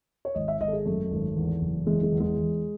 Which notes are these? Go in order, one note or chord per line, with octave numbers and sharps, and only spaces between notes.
C#5
G#1 D#5
E5
G#1 D#5
A4
G#4
F#2 A3
G#1
E2
F#1
E3 G#3
G#3
E2
G#3
E2